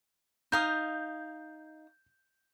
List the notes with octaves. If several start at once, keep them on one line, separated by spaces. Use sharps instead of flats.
D#4 F5 D#6 G6